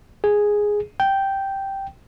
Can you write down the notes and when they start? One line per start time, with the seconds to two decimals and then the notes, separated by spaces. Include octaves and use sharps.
0.24 G#4
1.00 G5